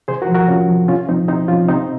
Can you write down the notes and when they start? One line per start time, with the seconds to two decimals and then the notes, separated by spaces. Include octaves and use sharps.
0.08 C3 G#4 C5
0.22 F#4 A#4
0.29 F3
0.35 F#4 A#4
0.48 C3 C#4 F4
0.69 F3
0.88 C3 C#4 F4
1.09 F3 C4 D#4
1.28 C3 C4 D#4
1.48 F3 C#4 F4
1.69 C3 C4 D#4